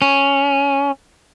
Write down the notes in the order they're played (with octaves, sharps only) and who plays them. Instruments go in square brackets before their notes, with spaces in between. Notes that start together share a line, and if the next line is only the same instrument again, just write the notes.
[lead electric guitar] C#4